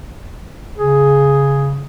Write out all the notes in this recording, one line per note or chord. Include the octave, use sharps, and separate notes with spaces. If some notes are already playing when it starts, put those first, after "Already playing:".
C#3 G#4